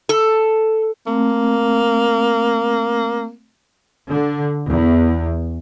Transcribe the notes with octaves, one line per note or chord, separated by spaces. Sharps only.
A4
A3 A#3 C4
D3
E2